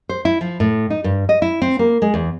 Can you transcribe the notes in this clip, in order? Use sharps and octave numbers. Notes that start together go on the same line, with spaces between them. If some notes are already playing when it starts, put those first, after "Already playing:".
C5
E4
F3
A2
D#4
G2
D#5
E4
C4
A#3
G#3
E2